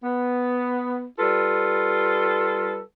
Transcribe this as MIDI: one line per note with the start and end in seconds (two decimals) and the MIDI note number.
0.03 1.04 59
1.19 2.80 55
1.19 2.80 65
1.19 2.80 69
1.19 2.80 71